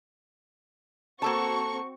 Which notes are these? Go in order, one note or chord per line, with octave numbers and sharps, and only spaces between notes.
A#3 C4 F#4 A4 A5 C#6